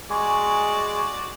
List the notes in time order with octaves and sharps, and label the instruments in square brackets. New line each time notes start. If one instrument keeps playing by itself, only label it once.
[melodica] G#3 G#4 [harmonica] F#4 D5 C#6